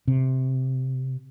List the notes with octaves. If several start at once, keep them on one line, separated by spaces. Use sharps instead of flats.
C3